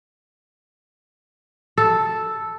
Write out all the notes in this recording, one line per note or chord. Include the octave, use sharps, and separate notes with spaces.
A4